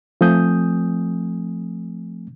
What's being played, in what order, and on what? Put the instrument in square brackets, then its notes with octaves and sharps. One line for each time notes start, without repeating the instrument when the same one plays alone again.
[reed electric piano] F3 A3 C4 G#5 D#6 G6